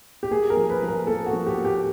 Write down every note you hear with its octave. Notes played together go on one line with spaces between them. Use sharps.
G4
A#3 G#4
A#4
F3
B4
F3
A#4
A#3 A4
F#4
F3
G4
A#3
G4